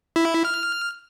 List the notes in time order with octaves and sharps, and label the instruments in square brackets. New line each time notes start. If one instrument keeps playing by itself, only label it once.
[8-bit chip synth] E4
F6